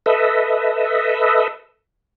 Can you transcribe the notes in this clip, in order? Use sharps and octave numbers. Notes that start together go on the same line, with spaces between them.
A4 B4 D#5 E5